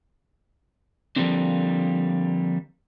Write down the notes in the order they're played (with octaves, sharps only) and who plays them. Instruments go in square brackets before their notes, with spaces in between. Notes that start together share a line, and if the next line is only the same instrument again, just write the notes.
[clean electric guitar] D3 F3 G3 A#3 C4 D4